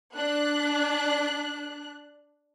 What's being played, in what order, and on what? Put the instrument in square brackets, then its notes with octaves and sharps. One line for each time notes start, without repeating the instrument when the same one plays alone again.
[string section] D4 F#6